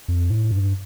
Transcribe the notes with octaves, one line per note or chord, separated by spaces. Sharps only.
F2
A2
G2